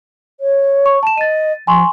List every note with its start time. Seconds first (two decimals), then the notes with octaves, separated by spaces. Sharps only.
0.40 C#5
0.86 C#6
1.03 A5 E7
1.18 D#5 A6 D#7
1.67 F3 G#5 C6 C#6